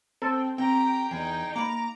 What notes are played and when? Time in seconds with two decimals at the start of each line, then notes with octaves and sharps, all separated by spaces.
0.22 C4 A4
0.58 C4 G4 G5 A#5
1.11 E2 D#4 G#4
1.56 A#3 A#5 B5 D6